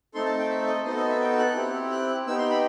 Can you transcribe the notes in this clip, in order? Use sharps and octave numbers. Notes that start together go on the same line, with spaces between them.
A3 C4 D#4 A4 C6
A5
G5
E5
D#5
B3 D#4 F#4 A4 C5
D#5
E5
G5
F#6
C4 E4 G4
F#6
B3 D#4 G4 E6
C6
B5